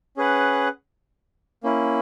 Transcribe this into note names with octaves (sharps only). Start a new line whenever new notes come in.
C#4 G#4 B4 F#5
A#3 C#4 E4